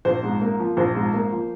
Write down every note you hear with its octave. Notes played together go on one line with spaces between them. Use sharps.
A#1 C5
G#2
A#3
F3
A#1 C5
G#2
A#3
F3